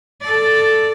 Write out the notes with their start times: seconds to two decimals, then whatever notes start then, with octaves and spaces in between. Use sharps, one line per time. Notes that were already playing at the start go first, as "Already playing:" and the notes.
0.22 A4 D5